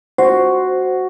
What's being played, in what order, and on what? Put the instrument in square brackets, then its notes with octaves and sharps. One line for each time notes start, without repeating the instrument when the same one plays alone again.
[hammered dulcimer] F#4 [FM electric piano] C5